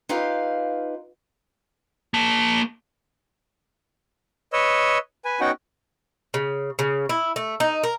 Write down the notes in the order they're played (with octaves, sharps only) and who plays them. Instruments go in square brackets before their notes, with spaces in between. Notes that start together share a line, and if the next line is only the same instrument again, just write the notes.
[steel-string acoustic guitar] D#4 F4 G4 B4 F5
[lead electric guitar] A#3 A5
[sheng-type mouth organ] B4 C#5 D#5 E6
B4 G#5
B3 C#4 D#4 F#4 F#5 G5
[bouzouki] C#3
C#3
E4
A3
D#4
A#4